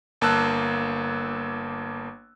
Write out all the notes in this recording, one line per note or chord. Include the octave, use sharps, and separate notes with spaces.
G1 A#3 A5 E6 F#6